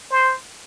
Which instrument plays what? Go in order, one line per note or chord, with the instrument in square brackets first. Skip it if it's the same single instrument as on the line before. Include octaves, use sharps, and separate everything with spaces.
[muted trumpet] C5